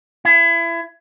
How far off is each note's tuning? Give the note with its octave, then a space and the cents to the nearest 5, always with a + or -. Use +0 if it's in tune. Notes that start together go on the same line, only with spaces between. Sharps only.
E4 +30